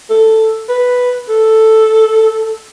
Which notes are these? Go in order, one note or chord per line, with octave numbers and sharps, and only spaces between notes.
A4
B4
A4